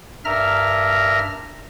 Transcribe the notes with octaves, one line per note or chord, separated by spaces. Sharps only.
G2 A#4 E5 A#5 F6 A#6